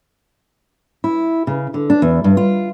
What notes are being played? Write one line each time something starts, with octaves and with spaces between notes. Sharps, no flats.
E4
C#3
D3
D4
E2
G2
F4